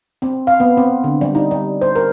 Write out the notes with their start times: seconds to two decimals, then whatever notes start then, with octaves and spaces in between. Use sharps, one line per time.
0.22 C4
0.47 F5
0.60 B3
0.77 C4
1.04 D3
1.21 G3
1.35 D#4
1.51 G3
1.81 C5
1.96 A#4